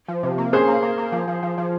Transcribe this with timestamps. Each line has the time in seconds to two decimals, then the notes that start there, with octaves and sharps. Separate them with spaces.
0.08 F3
0.23 C3
0.38 A#3
0.53 C#4 G#4 C5
0.68 A#3
0.83 A#3
0.98 A#3
1.12 F3
1.28 F3
1.43 F3
1.58 F3